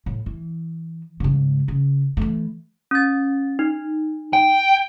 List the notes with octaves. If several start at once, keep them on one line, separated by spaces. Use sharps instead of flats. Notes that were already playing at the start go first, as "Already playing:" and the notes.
A2
E3
G#2 C#3
C#3
E3 A3
C#4 A6
D#4
G5